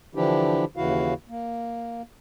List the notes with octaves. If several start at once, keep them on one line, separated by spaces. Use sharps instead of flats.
D3 E3 F3 D4 E4 G4
D#2 C#3 E3 E4 F#4 F5
A#3